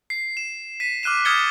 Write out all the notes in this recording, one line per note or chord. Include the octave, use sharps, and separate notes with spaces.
C7
E7
B6 D#7
D6 F6 F#6 D#7 E7
D#6 F6 G#6 A6 C#7 G7